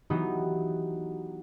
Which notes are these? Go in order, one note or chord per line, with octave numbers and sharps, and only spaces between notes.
E3 F#3 B3 D#4 G4